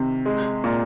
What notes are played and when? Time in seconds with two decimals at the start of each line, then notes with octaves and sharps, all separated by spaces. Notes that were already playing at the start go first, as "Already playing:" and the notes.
Already playing: C3 D#3
0.26 G#3
0.64 A#2